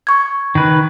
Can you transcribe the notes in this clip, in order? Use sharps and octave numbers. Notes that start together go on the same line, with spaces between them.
C#6 G#6
D#3 B4